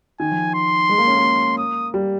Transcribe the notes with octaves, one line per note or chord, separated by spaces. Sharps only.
D#3 G#5
F3
C6
G#3
A#3
C#4
A#3
D#6
G3